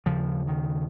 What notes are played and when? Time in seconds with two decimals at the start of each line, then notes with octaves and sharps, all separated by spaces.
0.06 D#2 C#3 F3
0.47 D#3